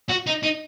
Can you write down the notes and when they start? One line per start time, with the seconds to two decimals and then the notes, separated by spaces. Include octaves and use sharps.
0.09 F#4
0.27 D#4
0.43 D#4